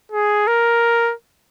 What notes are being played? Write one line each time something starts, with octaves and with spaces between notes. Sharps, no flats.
G#4
A#4